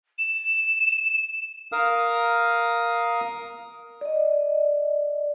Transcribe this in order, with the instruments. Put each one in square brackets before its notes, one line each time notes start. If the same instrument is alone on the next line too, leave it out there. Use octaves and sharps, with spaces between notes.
[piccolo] E7
[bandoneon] A#4 F5 D#6 F6
[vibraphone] D5 D#5